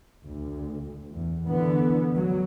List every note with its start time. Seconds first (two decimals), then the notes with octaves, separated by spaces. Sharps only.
0.24 D2
1.12 E2
1.47 D3 E3 B3
2.15 F#3